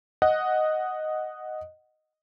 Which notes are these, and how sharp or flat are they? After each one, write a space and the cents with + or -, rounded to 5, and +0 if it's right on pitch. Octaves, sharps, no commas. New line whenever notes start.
D#5 +0 F#5 +0